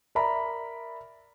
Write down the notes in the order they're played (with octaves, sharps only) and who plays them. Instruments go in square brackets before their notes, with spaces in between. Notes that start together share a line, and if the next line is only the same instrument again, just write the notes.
[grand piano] A#4 D5 E5 A#5 B5